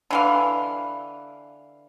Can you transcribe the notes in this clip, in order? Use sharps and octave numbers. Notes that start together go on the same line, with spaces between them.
D3 E3 F5